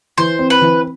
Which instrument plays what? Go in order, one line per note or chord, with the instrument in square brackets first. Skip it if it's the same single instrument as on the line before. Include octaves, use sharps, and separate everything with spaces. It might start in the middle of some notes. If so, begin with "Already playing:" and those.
[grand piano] E3 [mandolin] C5
[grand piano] C4
[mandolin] B4
[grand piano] E3